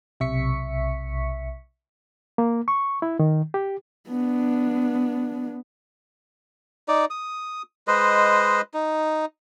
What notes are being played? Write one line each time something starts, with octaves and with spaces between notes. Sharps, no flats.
B1 C3 E5 C#6 B6 C#7
A#3
C#6
E4
D#3
G4
B3 D4
D#4 D5
D#6
G#3 B4 C5 D#5
D#4